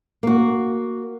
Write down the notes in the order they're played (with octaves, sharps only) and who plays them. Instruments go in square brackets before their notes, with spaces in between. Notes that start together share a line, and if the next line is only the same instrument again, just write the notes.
[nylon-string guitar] A#3 F#4